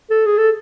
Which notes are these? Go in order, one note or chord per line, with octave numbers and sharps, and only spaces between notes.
A4
G#4
A4